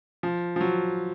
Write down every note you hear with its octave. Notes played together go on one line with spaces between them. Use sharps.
F3
F3
F#3